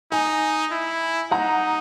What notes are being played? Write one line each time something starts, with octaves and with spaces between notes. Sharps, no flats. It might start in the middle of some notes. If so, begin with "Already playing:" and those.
D#4 G#5
E4
D#4 F#5 A#5